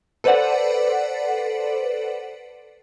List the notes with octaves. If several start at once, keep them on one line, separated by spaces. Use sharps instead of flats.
A4 B4 C5 D5 F#5